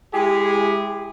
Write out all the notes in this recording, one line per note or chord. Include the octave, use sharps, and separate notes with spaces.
G#3 E4 G4 G#4